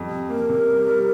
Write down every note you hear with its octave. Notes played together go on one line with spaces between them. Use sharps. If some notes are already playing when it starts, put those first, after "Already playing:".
Already playing: F2 G3
C3
A#3 A#4
C3
G3
G3